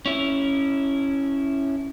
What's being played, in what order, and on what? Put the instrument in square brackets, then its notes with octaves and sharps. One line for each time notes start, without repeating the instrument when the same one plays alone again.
[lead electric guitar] C#4 E4